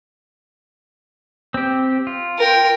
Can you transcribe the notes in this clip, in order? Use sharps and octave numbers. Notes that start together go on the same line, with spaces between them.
C4 G4
F4
A#4 G5